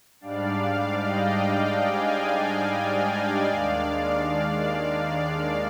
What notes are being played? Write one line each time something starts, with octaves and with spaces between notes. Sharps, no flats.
G#2 G3 D4 D5 F5
D5 F5
D#5 G5
D#5 G5
F5 G#5
D#5 G5
D5 F5
D5 F5
D#2 D#3 G#3 D4